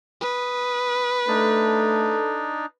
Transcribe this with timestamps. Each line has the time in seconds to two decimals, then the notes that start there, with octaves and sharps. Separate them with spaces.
0.21 B4 D#6
1.28 A3 D4 D#4 A4